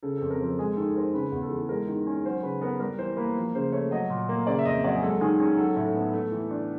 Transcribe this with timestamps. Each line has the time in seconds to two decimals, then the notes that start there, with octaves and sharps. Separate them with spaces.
0.03 C#3 A4
0.17 F2 A4
0.30 A#4
0.40 F3 A4
0.59 G#3 G#4
0.77 D#3 A4
0.95 C4 A#4
1.14 C#3 B4
1.32 E2
1.42 A4
1.51 E3
1.69 G#3 A#4
1.88 D#3
2.07 C#4
2.25 F#3 C5
2.43 C#3 B4
2.61 B3 A#4
2.80 G3 A#4
2.99 E3 C5
3.17 A#3 B4
3.36 F3
3.55 C#3 C5
3.72 A3 C#5
3.91 F#3 D#5
4.10 A#2
4.29 A#3
4.47 C#3 D5
4.59 E5
4.65 F2 D#5
4.84 F#3 D5
4.95 G#4
5.02 G#3 A4
5.21 D#3 G#4
5.39 C#4 G#4
5.57 F#3 A4
5.76 A2
5.95 B3
6.13 A3
6.32 E3
6.51 D4